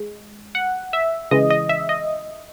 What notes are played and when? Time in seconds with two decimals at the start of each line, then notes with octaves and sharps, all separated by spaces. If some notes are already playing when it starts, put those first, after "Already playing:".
Already playing: G#3
0.55 F#5
0.93 E5
1.31 C#3 E3 G#3 D#5
1.50 D#5
1.69 E5
1.89 D#5